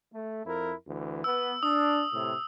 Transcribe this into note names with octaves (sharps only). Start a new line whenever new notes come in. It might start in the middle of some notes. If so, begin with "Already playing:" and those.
A3
F2 E4 A#4
D2 E3
B3 E6
D4 D#6
A2 C3